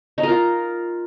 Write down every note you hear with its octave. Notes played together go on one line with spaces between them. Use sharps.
D#4
A#4
F4